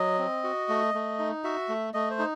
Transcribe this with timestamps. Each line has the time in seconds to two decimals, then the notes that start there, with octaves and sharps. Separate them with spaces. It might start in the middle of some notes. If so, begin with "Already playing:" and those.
Already playing: F#3 D#5
0.19 C4
0.44 F#4
0.69 A3
0.94 A3
1.19 D#4
1.44 F#4 E5
1.69 A3
1.94 A3 D#5
2.10 C5
2.19 D#4